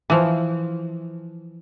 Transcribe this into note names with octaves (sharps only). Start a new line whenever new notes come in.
E3 F3